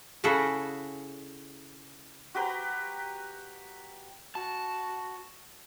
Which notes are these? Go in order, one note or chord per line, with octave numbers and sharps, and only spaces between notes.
C#3 E4 F#4 G#4 A4
F#4 G4 B4 A#5
F#4 A5